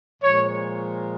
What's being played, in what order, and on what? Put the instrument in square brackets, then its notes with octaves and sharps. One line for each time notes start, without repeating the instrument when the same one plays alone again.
[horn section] A#2 F3 G#3 C#5